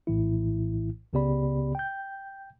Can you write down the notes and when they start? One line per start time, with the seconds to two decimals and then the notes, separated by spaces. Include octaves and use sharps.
0.07 A#1 A2 E3 E4
1.13 C#2 C#3 B3 G4 D5 B5
1.75 G5 G6